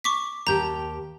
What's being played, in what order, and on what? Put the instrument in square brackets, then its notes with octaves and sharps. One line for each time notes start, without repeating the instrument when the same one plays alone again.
[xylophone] C#6 D6 B6
[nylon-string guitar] D#2 G4 A5 [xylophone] A#5 G6